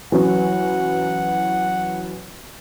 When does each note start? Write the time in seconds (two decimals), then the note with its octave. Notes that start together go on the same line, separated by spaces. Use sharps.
0.12 E3 F#3 C#4 F#5